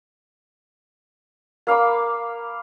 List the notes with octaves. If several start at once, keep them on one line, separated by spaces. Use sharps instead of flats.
A#3 F5 B5 D6